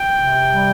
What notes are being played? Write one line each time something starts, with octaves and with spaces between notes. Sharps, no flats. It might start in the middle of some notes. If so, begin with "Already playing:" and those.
Already playing: G5
C3
G3